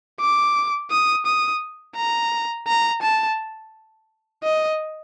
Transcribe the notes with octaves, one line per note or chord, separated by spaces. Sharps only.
D6
D#6
D#6
A#5
A#5
A5
D#5